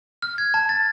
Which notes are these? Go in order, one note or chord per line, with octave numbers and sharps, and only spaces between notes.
F6
G#6
A5
A6